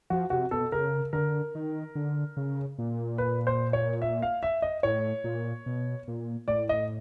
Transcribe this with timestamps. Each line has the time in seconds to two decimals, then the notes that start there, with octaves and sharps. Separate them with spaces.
0.10 F3 F#4
0.30 C3 F#4
0.51 B2 A4
0.72 C#3 A#4
1.13 D3 A#4
1.55 D#3
1.95 D3
2.37 C#3
2.78 A#2
3.18 B4
3.47 C5
3.73 C#5
4.02 E5
4.22 F5
4.43 E5
4.62 D#5
4.83 A2 C#5
5.24 A#2
5.66 B2
6.08 A#2
6.48 A2 D5
6.69 D#5